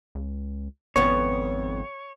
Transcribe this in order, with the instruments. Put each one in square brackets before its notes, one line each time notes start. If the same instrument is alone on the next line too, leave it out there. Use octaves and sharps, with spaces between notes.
[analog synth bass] C#2
[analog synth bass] G#1 [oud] F2 B3 C#4 [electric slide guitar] C#5